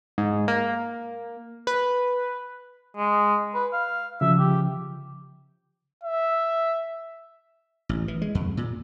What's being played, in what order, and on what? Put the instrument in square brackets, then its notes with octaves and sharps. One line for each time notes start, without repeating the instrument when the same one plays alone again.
[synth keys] G#2
A#3
B4
[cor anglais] G#3
B4
F5
[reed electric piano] C#3 F3 [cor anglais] E5
[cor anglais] G4
[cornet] E5
[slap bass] A1
E3
G#3
F2
A#2